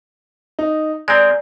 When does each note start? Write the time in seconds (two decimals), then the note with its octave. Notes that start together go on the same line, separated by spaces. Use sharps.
0.59 D#4
1.08 G#3 C4 D5 G#5 A#5